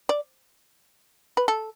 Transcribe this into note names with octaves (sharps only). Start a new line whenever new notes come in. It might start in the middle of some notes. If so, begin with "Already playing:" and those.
D5
B4
A4